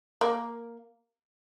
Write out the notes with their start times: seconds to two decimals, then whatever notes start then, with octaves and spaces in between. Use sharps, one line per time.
0.21 A#3